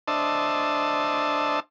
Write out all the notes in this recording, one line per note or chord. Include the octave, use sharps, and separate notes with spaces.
D4 C5 D#5 E5 A5